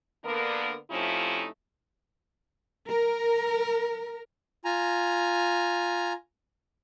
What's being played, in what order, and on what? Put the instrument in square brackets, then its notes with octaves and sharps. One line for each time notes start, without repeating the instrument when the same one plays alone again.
[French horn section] D3 A#3 B3 D4 A#4
C3 F3 A3 C#4 D#4 E4
[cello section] A#4
[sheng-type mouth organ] F4 G#5 A#5